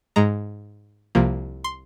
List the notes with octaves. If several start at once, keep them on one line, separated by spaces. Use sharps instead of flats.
G#2 G#3 A#5
C2 C3 F3 A#3
C6